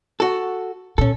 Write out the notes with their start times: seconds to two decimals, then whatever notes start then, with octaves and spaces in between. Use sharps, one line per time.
0.20 F#4 A4
0.98 A#2 C#4 A4